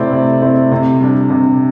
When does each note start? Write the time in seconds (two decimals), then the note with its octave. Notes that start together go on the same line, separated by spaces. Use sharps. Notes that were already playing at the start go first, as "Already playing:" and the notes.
Already playing: C3 A3 C4 E4 D5
0.13 C3
0.42 A3 C4 E4
0.71 C3
1.00 G3 D4
1.30 C3